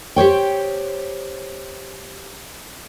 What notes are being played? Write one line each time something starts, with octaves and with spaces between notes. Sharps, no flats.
G4 C5 C#5 G5